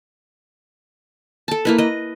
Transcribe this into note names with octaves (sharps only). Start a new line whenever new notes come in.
A4 A5
A#3 E4 B4
B4 D#5